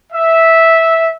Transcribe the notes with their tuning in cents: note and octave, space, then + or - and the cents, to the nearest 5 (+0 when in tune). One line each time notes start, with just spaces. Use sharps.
E5 -10